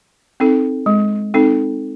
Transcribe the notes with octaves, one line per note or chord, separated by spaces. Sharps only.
C4 D#4 A4
G#3
C4 D#4 A4